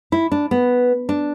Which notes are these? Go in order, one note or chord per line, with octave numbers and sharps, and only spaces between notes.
E4
D4
B3
D4